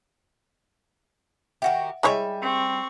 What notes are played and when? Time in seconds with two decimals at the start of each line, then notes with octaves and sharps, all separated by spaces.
1.62 D#3 F#4 G4 E5 F#5
2.03 G3 G#3 E4 G#4 C#5 D#5 E5 G#5
2.42 C4 C#6